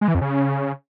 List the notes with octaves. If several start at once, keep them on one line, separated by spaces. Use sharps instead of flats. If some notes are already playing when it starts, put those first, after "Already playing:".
G#3
E3
F2
C#3